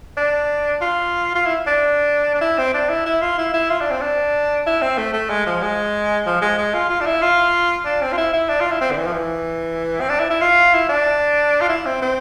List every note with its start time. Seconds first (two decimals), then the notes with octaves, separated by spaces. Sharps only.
0.17 D4
0.81 F4
1.35 F4
1.46 E4
1.67 D4
2.34 D4
2.41 E4
2.58 C4
2.74 D4
2.89 E4
3.06 E4
3.22 F4
3.38 E4
3.54 E4
3.70 F4
3.81 D4
3.91 C4
4.01 D4
4.66 E4
4.82 C4
4.98 A3
5.13 A3
5.30 G#3
5.46 F3
5.62 G#3
6.26 F3
6.41 G#3
6.58 G#3
6.74 F4
6.90 F4
7.01 D4
7.06 E4
7.22 F4
7.85 D4
8.02 C4
8.13 F4
8.18 E4
8.33 E4
8.49 D4
8.60 F4
8.71 E4
8.81 C4
8.91 D3
8.98 E3
9.07 F3
9.13 E3
10.01 C4
10.09 D4
10.20 E4
10.30 E4
10.41 F4
10.74 E4
10.89 D4
11.61 F4
11.69 E4
11.86 C4
12.02 C4